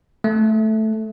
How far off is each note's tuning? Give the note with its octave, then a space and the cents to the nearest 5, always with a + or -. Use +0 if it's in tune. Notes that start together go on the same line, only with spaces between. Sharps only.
A3 -5